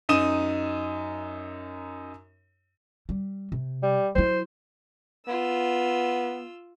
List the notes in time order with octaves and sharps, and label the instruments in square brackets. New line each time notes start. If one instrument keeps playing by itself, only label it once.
[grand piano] F#2 D#4 D#6 D#7 E7
[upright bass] G3
C3
[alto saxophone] G3
[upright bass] F#3 E4 [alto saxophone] C5
[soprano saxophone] B3 [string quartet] F4 E6